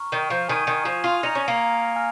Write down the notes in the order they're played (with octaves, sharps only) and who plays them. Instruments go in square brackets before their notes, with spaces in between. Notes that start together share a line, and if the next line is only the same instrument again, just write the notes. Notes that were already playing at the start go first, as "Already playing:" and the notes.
Already playing: [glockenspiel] A#5 C#6 F6
[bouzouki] D#3
F3
[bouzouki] D#3 [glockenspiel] G#5 D#6 G#6 D#7
[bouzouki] D#3
F3
F4
[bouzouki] D#4 [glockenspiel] F6 A#6 C#7 F7
[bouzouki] C#4
A#3
[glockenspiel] G#5 F6